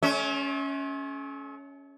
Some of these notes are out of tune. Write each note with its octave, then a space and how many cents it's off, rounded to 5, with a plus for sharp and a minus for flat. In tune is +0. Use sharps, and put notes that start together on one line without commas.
A3 -40 C#4 +10 E5 -40